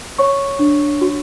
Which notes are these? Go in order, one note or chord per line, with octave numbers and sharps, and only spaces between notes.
C#5 C#6
D4
F#4